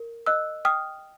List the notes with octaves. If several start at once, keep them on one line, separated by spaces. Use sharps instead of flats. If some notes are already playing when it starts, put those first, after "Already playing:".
Already playing: A#4
D#5 E6 F#6
G5 D#6 F6